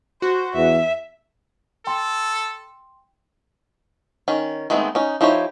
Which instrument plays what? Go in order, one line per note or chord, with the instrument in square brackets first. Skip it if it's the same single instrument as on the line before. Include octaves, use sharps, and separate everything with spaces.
[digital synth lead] F#4 [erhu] C5
[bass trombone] E2 [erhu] E5
[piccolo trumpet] A4 [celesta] G5 C6
[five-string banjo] D#3 C#4
D#3 G#3 A3 B3 C4
C#4 D#4
F3 D#4 E4 G4 C#5